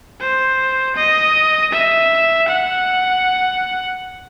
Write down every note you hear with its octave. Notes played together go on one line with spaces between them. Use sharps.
C5
D#5
E5
F#5